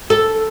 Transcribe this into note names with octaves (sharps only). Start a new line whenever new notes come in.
A4